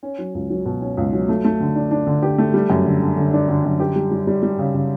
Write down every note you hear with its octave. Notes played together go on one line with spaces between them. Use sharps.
C#4
F#3
C#2
F#3
B2
C#4
C#2
F#3
A3
A3
D3
D4
D4
D3
G4
A3
G3
F#2
D3
D3
D3
D4
D3
F#2
G4
G3
G3
G3
G3
C#3
C#3